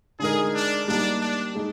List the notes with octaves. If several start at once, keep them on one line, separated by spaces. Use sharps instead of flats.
D3 G#3 D#4 G#4 A#4
D4
G3 A#3 D4 D#4
D4
G#3 D#4